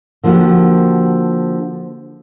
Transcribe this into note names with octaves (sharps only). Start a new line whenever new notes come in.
D3 F3 A#3 C4 F#4 G4